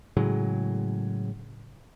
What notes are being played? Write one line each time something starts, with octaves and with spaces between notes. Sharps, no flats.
A2 C#3 F#3 G#3